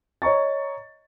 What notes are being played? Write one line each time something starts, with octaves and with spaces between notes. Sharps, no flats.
C#5 D#5 A#5 C#6 A6